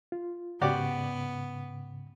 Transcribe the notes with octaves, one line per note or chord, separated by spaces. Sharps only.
F4
G#2 C#3 B3 F#4 G4 D5